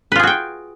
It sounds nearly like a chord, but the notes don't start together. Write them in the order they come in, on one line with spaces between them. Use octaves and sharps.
B4 F4 G#4 F#4 G5